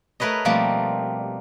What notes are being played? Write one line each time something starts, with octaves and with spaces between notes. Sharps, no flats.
A3 A#4 B4 C#5 D#5
B2 F3 G3 A3 A#3 C4